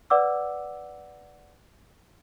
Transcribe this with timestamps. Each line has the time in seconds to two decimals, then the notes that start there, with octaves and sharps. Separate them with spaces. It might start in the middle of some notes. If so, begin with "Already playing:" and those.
0.10 B4 D5 F#5 D6 E6